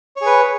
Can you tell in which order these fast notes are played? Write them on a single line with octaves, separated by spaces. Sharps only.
C#5 G#4 B4